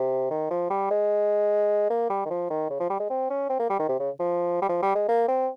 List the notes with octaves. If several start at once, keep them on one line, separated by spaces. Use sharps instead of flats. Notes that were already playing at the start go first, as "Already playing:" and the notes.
Already playing: C3
D#3
F3
G3
G#3
A#3
G3
D#3
F3
D#3
C#3
F3
G3
G#3
C4
C#4
C4
A#3
G3
D#3
C3
C#3
F3
G3
F3
G3
G#3
A#3
C4